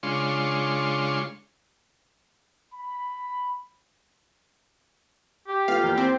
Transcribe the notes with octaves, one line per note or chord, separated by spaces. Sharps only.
C#3 G#3 D4 F4 C6 C#6
B5
G4
A3 B3 F4 F5
E2 A#3
C4